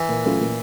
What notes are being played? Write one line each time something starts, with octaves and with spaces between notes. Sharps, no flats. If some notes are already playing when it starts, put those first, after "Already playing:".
Already playing: E3
A#2
F#3 A3 C#4 F4
A#2